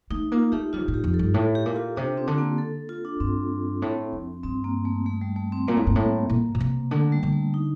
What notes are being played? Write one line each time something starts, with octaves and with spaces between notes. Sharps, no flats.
A3 D#4
A#3 F4
A3 G4
G3 F4
A#2
A2
G4
F2
A4
G2
A2 A4
G4
A#2
F4
C3 D4
C4
D3
A#3
A4
F4
D4
G2 C4
A2
F2
G2 C4
A#3
A3
A3
G3
A3
C4
A#2 A#3
A2
G2
A2
A#2
A#2
C3
D3 A3
G3
D3
A3
D#4